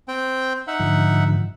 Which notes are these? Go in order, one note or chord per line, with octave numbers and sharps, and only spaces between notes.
C4 G5
D#4 E5 F#5
G#2 D3 F3